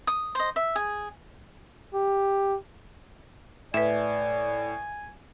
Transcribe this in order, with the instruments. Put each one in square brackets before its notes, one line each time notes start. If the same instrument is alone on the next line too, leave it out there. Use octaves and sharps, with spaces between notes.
[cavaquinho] D#6
C5 D#5
E5
G#4
[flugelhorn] G4
[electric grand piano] A2 [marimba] B4 E5 [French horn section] D5 [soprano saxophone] G#5